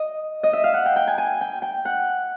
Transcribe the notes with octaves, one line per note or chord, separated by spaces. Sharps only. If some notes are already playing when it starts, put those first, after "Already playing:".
Already playing: D#5
D#5
E5
F5
F#5
G5
G5
G#5
G#5
G5
G5
F#5